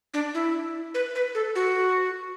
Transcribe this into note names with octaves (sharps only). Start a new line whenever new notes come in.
D4
E4
B4
B4
A4
F#4